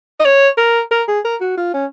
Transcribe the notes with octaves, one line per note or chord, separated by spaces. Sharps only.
D#5
C#5
A#4
A#4
G#4
A#4
F#4
F4
C#4